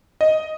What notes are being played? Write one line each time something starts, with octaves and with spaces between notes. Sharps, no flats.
D#5